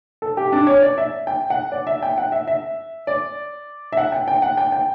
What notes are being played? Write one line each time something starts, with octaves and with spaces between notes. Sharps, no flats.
A4
G4
D4
C#5
D5
E5
G5
F#5
D5
E5
G5
F#5
E5
E5
D5
E5
F#5
G5
G5
F#5
G5
G5